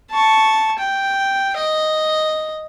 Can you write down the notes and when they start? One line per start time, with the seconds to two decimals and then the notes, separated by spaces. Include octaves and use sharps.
0.11 A5 C#6
0.79 G5
1.57 D#5